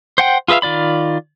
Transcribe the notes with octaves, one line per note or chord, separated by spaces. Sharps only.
C5 F#5 G5
F4 G#4 B4 E5 F5
D#3 F4 D5 B5